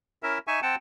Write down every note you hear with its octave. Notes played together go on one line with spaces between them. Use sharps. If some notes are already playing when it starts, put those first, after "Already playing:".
C#4 E4 A#4 E5
D#4 E5 G#5 C#6
C4 F#5 G5 A5